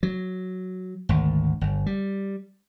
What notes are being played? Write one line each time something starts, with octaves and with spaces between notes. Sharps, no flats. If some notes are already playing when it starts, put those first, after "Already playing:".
F#3
G#1 D2
G1
G3